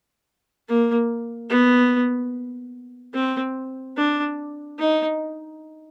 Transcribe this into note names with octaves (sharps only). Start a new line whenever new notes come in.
A#3
B3
C4
D4
D#4